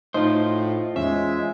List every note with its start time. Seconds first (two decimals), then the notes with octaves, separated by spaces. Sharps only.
0.14 A2 D#4 F4 C5 D#5
0.96 E2 G#3 C#4 E5